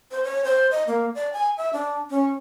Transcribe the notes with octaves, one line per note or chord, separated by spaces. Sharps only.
C5
C#5
C5
D#5
A#3
D5
G#5
E5
D4
C#4